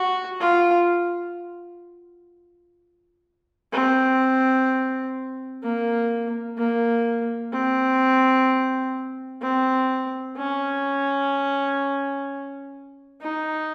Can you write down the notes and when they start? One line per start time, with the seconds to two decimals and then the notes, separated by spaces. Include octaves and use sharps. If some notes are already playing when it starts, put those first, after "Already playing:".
Already playing: F#4
0.40 F4
3.72 C4
5.63 A#3
6.58 A#3
7.53 C4
9.42 C4
10.37 C#4
13.21 D#4